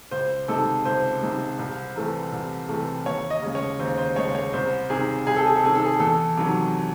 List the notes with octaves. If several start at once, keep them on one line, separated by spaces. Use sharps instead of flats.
C#2 C5
C3 D#3 G#3 A4
C#2 C5
C3 D#3 G#3
C2
C3 E3 A3
C2
C3 E3 A3
D#2 C#5
D#5
C#3 G#3
C#5
D#2 C5
C5
C#3 G#3 C#5
C#5
C2 C5
C3 D#3 G#4
C2 G#4
A4
G#4
A4
C3 D#3 G#4
A4
G#4
E2 A4
C3 D#3 F#3